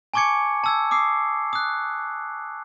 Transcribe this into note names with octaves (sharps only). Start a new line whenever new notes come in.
G#5 A5 C#6 D6 G#6 C#7
A5 E6 G#6
D6 D#6 C7
D#6 F#6